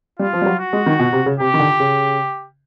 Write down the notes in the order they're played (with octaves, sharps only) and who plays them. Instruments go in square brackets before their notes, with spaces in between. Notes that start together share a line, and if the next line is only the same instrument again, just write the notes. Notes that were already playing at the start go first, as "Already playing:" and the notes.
[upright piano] G3 [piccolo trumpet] F4
[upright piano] F3
G3
F#3
[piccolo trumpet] F#4
[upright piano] G#3
D#3
B2
C3
C#3
[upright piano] C3 [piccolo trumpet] G4
[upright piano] D#3
D3
C#3